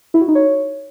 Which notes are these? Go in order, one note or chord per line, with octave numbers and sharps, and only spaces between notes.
E4
F#4
D#4
C#5